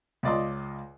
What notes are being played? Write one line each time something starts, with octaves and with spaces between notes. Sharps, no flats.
C#2 F4 D5 D#5 C6